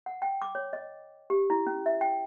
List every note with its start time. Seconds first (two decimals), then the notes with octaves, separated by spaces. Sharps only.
0.06 F#5
0.22 G5
0.42 D6
0.55 C#5
0.73 D#5
1.30 G4
1.50 E4
1.67 C#4
1.86 E5
2.01 G5